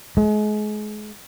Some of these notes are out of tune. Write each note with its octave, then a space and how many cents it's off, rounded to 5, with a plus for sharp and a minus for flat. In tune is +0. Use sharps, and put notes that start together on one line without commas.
G#3 +35